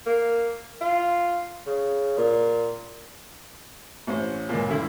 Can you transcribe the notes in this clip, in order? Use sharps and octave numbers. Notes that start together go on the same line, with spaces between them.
A#3
F4
C#3
A#2
A1 C#4 C5
C#2 A#2
G2 D3 E4